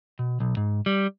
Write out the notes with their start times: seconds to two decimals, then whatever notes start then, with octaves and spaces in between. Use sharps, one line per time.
0.19 B2
0.40 B1
0.57 G#2
0.86 G3